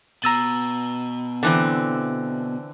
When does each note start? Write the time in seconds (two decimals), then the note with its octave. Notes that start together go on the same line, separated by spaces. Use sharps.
0.24 B2 A#5 E6 A6
1.43 D3 E3 C4